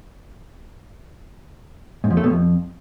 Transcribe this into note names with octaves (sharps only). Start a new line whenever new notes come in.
G#2
F2
A3
B2
F2